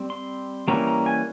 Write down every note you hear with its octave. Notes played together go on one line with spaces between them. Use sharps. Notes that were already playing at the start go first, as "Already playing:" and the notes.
Already playing: G3 C4
C6
E3 G3 A#3 C#4 A#5
A#5
G#5